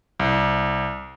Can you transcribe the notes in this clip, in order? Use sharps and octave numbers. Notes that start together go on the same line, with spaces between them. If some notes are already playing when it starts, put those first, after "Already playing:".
C2